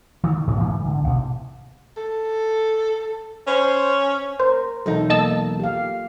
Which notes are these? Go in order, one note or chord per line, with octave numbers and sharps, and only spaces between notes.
D#3
G#2 B2 E3
G#2 E3 G#3 B3
D3
A1 B2
A4
C#4 C5
A#4 C5
B1 E2 D#4 A4
A#3 D#5 A5 E6
G4 F5